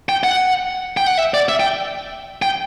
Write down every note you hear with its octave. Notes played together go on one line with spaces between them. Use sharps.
G5
F#5
G5
F#5
E5
D5
E5
G5
G5